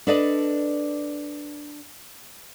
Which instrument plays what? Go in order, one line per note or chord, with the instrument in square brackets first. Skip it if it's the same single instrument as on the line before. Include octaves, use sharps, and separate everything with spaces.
[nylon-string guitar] D4 A4 B4 D5 D#5